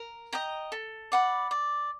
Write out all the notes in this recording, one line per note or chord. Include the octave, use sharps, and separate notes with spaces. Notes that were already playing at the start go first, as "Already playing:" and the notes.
Already playing: A#4
D#5 G5 A#5
A4
D5 F#5 B5
D5